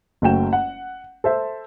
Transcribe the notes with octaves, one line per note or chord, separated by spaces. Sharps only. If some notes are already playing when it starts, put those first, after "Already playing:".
F#1 A3 F#4 G5 E7
F#5
A4 C5 E5